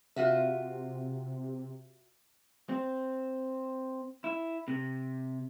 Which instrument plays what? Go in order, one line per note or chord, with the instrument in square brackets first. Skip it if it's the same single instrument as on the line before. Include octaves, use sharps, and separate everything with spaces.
[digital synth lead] C3 [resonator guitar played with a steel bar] F4 F#4 E5
[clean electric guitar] C4
E4
C3